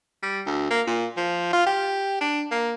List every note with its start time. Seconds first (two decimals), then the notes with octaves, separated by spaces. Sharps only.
0.23 G3
0.46 D2
0.71 A#3
0.87 A#2
1.17 F3
1.53 F4
1.66 G4
2.21 D4
2.51 A#3